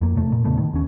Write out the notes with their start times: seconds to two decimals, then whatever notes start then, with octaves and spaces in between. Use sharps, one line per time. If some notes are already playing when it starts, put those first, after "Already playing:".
0.01 F2 A#3
0.15 E1 C3 A3
0.32 A#2
0.44 E2 C#3 A3 B3
0.58 D#3
0.73 D#2 C#4